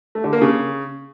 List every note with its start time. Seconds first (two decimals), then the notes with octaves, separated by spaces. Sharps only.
0.15 A3
0.24 D3
0.33 A#3
0.41 C#3